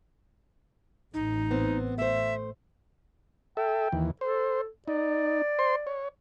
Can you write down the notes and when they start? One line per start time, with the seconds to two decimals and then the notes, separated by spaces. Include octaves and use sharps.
1.14 A1 D#4
1.51 B3 C4
1.98 A3 C5 E5
3.57 A4 E5 G5
3.92 D#2 E3
4.21 A4 C5
4.88 D#4 D5
5.59 C5 C6
5.87 C#5